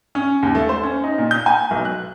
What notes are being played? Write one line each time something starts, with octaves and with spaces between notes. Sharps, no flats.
C#4
D#2
A3
C5
C#4
D#4
A#2
G6
G#5
B1
F#6